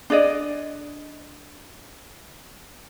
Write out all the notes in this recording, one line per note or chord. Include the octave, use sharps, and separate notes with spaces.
D4 G#4 D5 D#5